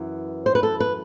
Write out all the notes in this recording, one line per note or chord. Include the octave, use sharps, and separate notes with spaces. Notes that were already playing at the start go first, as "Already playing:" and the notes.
Already playing: F#2 E3 B3
C5
B4
A4
B4